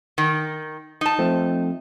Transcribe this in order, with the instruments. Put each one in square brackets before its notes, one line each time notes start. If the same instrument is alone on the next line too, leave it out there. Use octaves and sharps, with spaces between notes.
[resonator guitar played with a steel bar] D#3
D#4 A5
[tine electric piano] F3 A3 C4